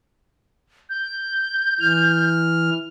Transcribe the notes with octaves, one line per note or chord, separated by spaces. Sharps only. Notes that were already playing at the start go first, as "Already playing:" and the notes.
G6
E3 F6